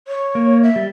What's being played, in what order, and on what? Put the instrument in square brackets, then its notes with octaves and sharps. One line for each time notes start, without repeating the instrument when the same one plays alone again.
[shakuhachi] C#5
[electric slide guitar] A#3
[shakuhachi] E5
[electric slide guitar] G3